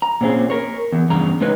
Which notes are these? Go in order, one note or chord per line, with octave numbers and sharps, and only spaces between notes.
A#5
A#2 C4 C#4 G#4
A#4 C#5
E2
E2 G2 C#3 A#5
A2 G#3 D#4 B4 C#5